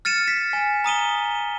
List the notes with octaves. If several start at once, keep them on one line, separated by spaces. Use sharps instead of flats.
F6 A6 C#7 D#7 E7
B6
G#5
A#5 D#6 D#7 G7